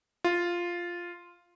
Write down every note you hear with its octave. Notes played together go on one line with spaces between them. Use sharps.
F4